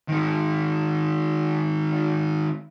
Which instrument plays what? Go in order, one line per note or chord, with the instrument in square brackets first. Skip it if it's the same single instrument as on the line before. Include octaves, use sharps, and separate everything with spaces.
[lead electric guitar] D#3 G#3